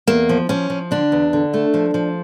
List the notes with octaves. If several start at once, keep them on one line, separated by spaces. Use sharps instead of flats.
E2 A#3
F3
F3 C#4
F3
D3 D4
E2
D3
A3
F3
F3